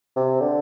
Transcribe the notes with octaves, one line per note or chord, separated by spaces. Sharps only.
C3
D3